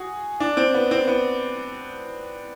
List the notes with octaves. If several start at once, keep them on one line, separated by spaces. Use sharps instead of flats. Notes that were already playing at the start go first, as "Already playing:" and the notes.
Already playing: F#4 G#4
D4
C4
B3
C4
B3